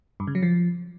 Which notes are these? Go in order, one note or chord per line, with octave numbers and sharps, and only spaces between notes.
G2
C#3
F#3
F3